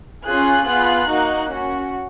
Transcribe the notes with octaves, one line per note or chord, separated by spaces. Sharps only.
C#4 F4 G#4 F#6
B3 F4 G#4
A#3 D#4 F#4
C#4 F#4